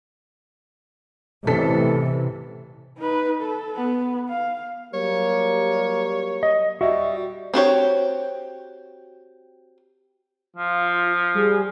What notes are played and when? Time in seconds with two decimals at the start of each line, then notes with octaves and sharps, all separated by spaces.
1.47 A1 A2 C3 E3 A4 B6
2.98 D#4 B4
3.41 A4
3.76 B3
4.29 F5
4.94 F#3 G3 A#3 C#5
6.43 D#5
6.81 G3 F#4 D#5 E5
7.54 C4 F#4 G4 C#5
10.56 F3 F4
11.34 G3 G#4